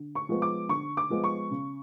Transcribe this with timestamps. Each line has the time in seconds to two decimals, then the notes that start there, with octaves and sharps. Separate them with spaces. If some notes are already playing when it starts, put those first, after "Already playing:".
Already playing: D3
0.15 C#6
0.29 F3 G#3 B3
0.42 D6
0.69 D3 C#6
0.97 D6
1.10 F3 G#3 B3
1.24 C#6
1.51 C#3